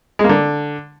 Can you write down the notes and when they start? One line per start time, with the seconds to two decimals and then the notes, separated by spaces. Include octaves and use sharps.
0.19 G#3
0.24 A#3
0.29 D3